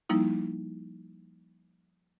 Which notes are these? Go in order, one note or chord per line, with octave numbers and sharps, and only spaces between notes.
F3 G3 A#3 D#4 E4